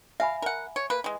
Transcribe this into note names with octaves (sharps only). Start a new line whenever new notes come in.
E5 F5 G#5 B5
A#4 F#5
C#5
A#3 B4
E3 G#3